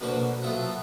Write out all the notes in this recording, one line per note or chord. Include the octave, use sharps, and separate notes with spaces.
B2 D3 A#3 B4 C5 C#6
F#3 B3 F4 A4 E5 F#5